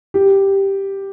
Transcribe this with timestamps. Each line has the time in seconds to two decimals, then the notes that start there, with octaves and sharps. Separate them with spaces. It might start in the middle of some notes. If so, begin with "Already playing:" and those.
0.14 G4